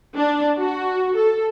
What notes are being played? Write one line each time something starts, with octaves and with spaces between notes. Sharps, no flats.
D4
F#4
A4